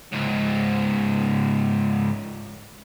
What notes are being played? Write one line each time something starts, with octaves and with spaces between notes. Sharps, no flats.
C#2 G#2